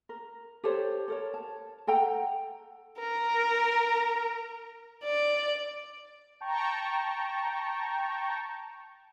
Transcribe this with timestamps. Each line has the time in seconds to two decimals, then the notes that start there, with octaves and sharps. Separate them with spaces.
0.09 A#4
0.64 G4 A4 C5 C#5
1.08 A4 A#4 C#5
1.34 A5
1.87 A4 F#5 G5 A#5
2.99 A#4
5.04 D5
6.41 G5 A5 A#5 C#6